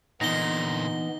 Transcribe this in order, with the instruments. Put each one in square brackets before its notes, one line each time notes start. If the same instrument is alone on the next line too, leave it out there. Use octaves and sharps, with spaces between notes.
[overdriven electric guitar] A#2 D3 [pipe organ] E3 B3 [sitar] D#4 [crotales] A#6 G7